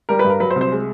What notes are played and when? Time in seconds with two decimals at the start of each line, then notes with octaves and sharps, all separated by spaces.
0.09 G3 A#4
0.19 B4
0.24 G2
0.30 A#4
0.40 F#3 B4
0.50 C5
0.56 C2
0.61 C5
0.72 G#3